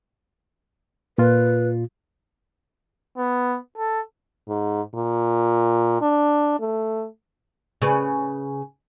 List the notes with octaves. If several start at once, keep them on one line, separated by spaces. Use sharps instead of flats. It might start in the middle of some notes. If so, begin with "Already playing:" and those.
A#2 F4 B4
B3
A4
G#2
A#2
D4
A3
C#3 B4